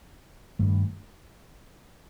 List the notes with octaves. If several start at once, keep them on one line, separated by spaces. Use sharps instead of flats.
G2 D#3 A3